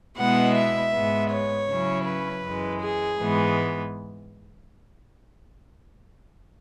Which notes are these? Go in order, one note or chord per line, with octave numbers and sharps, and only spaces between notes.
B2 G#3 B3 E4 F#5
E5
G#2 G#3 B3
C#5
C#3 F#3 C#4 E4
B4
F#2 E3 G#3
G#4
G#2 E3 G#3 B3